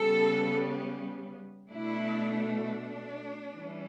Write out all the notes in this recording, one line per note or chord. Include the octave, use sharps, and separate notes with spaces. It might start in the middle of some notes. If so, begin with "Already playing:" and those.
Already playing: C#3 G3 B3 A4
B2 A3 D4 E4
D4
E3 G3 C#4